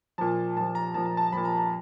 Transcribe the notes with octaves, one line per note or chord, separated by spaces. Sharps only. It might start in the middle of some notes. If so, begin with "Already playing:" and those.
A#2 F3 A5
A#2 F3 A5
A#5
A#2 F3 A5
A#5
A5
A#2 F3 B5
A#5
A#5